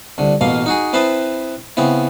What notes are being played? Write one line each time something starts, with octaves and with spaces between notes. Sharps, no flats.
C2 D3
A1 B2 A#3 F5
D#4 F#4 G#4
C4 E4 B4 C5 A5 D#6
C#3 B3 C4 E4